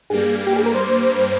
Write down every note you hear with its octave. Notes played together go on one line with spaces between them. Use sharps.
G2 G3 A#3 G#4
G4
G#4
A#4
C5